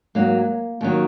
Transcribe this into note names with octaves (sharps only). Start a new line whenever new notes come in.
G#2 F#3 A#3
D#2 D#3 F#3